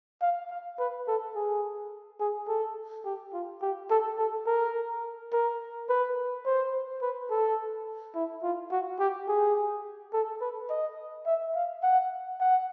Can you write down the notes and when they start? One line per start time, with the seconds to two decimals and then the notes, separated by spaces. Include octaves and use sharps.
0.22 F5
0.50 F5
0.79 B4
1.08 A4
1.35 G#4
2.20 G#4
2.48 A4
3.05 G4
3.33 F4
3.62 G4
3.90 A4
4.18 A4
4.46 A#4
5.32 A#4
5.89 B4
6.45 C5
7.02 B4
7.30 A4
8.15 E4
8.43 F4
8.71 F#4
8.99 G4
9.28 G#4
10.13 A4
10.41 B4
10.70 D#5
11.26 E5
11.55 F5
11.83 F#5
12.40 F#5